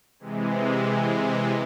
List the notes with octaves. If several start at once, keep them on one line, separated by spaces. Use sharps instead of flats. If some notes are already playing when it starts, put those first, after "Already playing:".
C3 E3 G#3